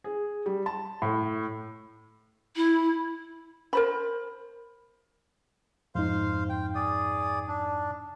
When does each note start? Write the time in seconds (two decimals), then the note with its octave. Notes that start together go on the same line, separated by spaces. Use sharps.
0.04 G#4
0.46 G3
0.66 A5
1.02 A2
2.56 E4
3.73 A#4 C5 B5
5.95 F2 G#2 D#4 C5 F5
6.50 G5
6.75 G#4 D5 D#6
7.47 D4